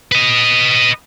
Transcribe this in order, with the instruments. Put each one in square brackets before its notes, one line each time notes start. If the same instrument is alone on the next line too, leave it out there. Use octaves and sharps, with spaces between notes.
[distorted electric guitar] B4 D#5